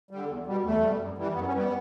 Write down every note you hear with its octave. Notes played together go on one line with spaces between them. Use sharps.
D3 G3
E2
B2 G3
E2 A3
B2 G3
F#2
E3 G3
F#2 B3
C#4
E3 G3
B3